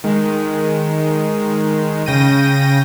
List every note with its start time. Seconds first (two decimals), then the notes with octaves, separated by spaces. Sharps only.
0.04 D#3 G#3
2.06 C#3 G5 A#6 D#7